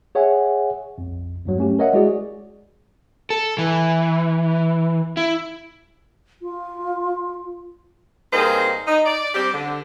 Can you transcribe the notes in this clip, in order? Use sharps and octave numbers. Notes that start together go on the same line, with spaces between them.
G#4 C#5 E5 F#5 G#5
A#1 F2
E2 G2 F#3
A3 C#4 G4
A#4 C#5 D#5 E5 F#5
G#3 E4 F#4 G#4 D5
A4
E3
E4
F4
G2 A#3 C4 D#4 G#4 C5
D#4
D5
G3 C4 D4 G4
D3